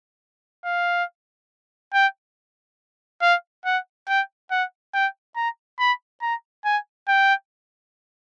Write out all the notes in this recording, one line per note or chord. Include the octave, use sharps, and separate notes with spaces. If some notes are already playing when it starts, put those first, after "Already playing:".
F5
G5
F5
F#5
G5
F#5
G5
A#5
B5
A#5
G#5
G5